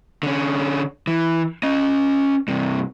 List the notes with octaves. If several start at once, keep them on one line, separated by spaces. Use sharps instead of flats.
D3 C#4
E3
C#4 D#5
G2 C3